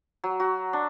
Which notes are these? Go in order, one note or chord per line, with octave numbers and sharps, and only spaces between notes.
F#3
F#4
D4